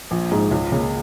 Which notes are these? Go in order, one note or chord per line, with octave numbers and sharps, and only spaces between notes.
A#1
G#2 G#3 D#4
C#2
C#3 A#3